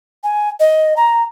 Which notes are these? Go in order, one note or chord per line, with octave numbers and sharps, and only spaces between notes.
G#5
D#5
A#5